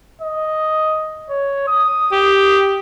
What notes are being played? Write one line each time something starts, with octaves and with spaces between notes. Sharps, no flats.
D#5
C#5
D#6
G4